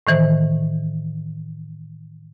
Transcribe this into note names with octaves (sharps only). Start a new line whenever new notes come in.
A2 D#3 E3 C5